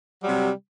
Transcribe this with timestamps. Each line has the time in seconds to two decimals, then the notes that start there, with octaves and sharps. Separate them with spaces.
0.21 G3
0.24 F#3
0.27 C3